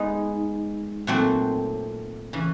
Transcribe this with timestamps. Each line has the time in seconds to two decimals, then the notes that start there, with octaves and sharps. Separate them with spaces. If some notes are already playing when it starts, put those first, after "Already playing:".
Already playing: G#3 B3 D#4
1.07 A#2 F#3 A3 C4
2.33 C#3 E3